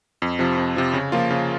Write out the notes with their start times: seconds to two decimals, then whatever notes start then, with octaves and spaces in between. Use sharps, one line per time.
0.22 F2
0.39 C3 F3
0.58 F2
0.76 C3 F3
0.93 C#3
1.12 F3 A#3 F4
1.30 C#3